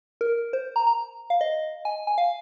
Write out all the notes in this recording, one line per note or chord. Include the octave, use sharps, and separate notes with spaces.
A#4
C5
A#5
A#5
F5
D#5
G#5
G#5
F5